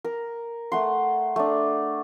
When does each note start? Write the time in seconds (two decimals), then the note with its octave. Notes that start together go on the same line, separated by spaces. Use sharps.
0.04 A#4
0.72 A3 F#5 C6
1.36 A3 D4